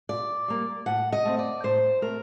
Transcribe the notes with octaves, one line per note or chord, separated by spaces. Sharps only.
A#2 D5
G3 A#3
A2 F#5
D#5
A3 C4
D5
A2 C5
A3 C4 A#4